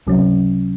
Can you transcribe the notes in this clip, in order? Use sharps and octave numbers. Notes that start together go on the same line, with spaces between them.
C#2 C3 F#3 C#4